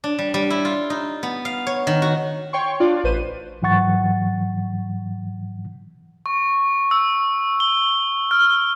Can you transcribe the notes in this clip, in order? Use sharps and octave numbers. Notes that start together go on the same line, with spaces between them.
D4
G3
G3
E4
F4
D#4
B3
F5
C#5
D#3
F#4
C#5 G5 C6 C#6
D4 F4 D5
A1 B4 C5 D#7
G#2 E3 F#3 F#5 C#6 A6
C#6
E6
G7
F6